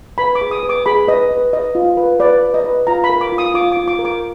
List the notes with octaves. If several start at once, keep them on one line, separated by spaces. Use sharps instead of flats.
B4 B5
D6
G#4
D#6
B4
D6
G#4 B5
B4 D#5
B4
B4 D#5
F4
B4
B4 D5
B4
D#5
B4
F4 A#5
B5
A#4
D6
F4
D#6
F4 D6
F4 D6
D6
A#4
D6